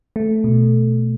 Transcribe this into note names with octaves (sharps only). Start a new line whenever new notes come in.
A3
B2